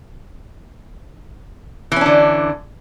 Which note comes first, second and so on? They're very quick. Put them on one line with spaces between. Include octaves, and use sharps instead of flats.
E3 C#4 D4 D3